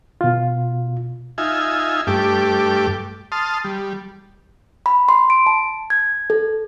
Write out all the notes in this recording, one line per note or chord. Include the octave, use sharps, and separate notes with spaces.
B2 F4
D#4 F4 E5 G#5
G2 A3 G4 D6
A5 C6 D#6 F6
G3
B5
C6
D7
A5
G#6
A4